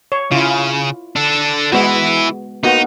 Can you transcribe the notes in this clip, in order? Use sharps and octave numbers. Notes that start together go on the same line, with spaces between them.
C#5
C#3 E4 F4
D4 A4
E3 G#3 B3 E4 F#4
A#3 B3 D#4 F#4